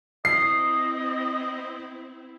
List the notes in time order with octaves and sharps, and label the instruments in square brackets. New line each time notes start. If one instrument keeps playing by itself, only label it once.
[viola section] C4 E4 [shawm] D#5 [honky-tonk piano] C7